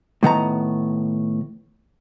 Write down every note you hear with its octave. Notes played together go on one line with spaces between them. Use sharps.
A2 D#3 B3 A#5